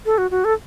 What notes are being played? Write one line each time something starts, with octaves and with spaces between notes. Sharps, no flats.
A4
F#4
F#4
A4